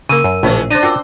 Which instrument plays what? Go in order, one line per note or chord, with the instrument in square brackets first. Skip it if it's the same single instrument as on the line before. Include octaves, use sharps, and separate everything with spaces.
[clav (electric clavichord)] C#3 A#3 [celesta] A#4 E6 D#7
[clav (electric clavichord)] F#2
[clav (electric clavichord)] A#1 A2 [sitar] C#3 E3 C#4
[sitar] D4 C5 [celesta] A6 A#6 D#7
[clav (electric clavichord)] F4 F#4 A#4 [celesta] G5 D6 E6